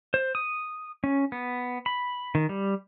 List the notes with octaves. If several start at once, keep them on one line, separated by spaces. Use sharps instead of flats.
C5
D#6
C#4
B3
B5
D#3
G3